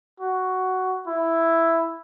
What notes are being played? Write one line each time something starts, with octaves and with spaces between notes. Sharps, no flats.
F#4
E4